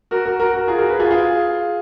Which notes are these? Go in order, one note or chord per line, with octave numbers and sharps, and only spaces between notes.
F#4 A#4
F#4 A#4
F#4 A#4
F#4 A#4
F4 G#4
F#4 A#4
G#4 B4
F4 G#4
F4 G#4